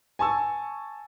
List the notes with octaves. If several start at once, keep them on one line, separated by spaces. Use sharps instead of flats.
G#5 A5 C#6 E6